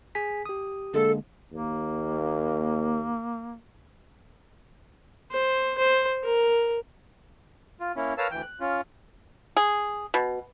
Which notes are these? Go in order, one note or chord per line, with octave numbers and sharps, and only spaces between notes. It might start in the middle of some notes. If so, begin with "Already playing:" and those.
G#4 G#5 B6
G4 D#6
D3 G#3 A#3 A4
D#2 A#3
C5
C5
A#4
F4
A#3 C#4 E4
A#4 B4 C#5 F5 A5 E6
D2 E3 G5
F#6
C#4 F4
G#4
B2